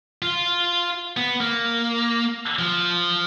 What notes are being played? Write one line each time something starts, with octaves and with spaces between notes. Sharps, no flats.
F4
B3
A#3
F3